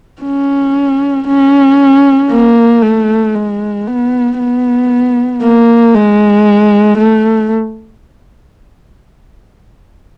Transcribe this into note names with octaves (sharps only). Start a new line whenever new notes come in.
C#4
C#4
A#3
A3
G#3
B3
B3
A#3
G#3
A3